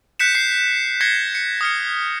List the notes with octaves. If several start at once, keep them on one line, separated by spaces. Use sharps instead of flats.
F#6 G6 B6 C#7 E7
G6 C7
G#6 A#6 C7 C#7 G7
C7 C#7
D#6 F6 C#7